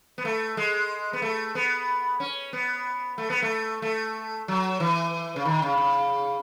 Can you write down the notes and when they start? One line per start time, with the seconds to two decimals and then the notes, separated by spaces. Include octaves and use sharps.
0.18 B3
0.25 A3
0.57 G#3
1.13 B3
1.22 A3
1.55 B3
2.20 C#4
2.53 B3
3.18 A3
3.30 B3
3.42 A3
3.82 A3
4.48 F#3
4.80 E3
5.36 C#3
5.45 D#3
5.62 C#3
5.78 C#3